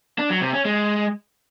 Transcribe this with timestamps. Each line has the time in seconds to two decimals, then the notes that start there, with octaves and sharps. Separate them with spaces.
0.19 D4
0.30 F#3
0.42 C3
0.54 C#4
0.65 G#3